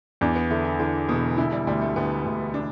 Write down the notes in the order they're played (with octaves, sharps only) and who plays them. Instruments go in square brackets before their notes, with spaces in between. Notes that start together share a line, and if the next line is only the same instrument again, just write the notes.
[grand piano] E2 [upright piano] D4
[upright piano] B3
[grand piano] D3 [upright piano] E4
[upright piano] E4
[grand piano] D3 [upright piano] E3
[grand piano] E1 [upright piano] B2
[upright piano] D3 [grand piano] E4
[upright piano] G3
[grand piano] D2 [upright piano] G3
[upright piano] A3
[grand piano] D2 [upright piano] B3
[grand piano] D2
[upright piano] D4